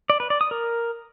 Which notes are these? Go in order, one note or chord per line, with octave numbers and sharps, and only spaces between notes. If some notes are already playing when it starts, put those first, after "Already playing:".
D5
B4
D5
D#6
A#4